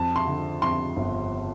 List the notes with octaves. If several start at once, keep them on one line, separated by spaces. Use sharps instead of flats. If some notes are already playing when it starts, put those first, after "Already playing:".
Already playing: F2 A5
C6
D3
F2 C6
G1